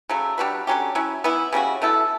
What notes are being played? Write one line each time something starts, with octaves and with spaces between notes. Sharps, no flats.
C#3 F#3 A3
G3 D4 F#4 B4
D3 F#3 C#4 G4
F#3 C#4 E4
E3 B3 E4
C#3 G3 C#4 F#4
B2 A3 E4 A4